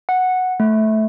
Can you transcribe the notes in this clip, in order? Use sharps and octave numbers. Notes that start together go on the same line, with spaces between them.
F#5
A3